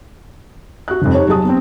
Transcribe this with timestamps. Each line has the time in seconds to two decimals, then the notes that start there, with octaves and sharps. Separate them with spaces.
0.88 F#4 F#6
1.02 F1 F2
1.15 D#4 G4 C#5
1.28 F#3 G#4 A5 D#6
1.45 B3 C4